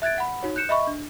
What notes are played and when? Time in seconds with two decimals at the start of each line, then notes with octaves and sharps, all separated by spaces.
0.02 E5 F#6 G#6 A6 D7
0.18 F#5 B5
0.43 D#4 F#4 C#5
0.56 F#6 G6 C#7 E7
0.69 D#5 E5 B5 C#6
0.87 D4